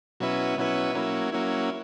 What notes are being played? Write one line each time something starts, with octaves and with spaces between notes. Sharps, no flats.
B2 F#3 C#4 E4 B4
B2 F#3 C#4 E4 B4
F#3 A#3 C#4 E4
F#3 A#3 C#4 E4